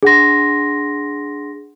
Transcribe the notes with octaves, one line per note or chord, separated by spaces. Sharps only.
D4 G#4 F#5 C6 A#6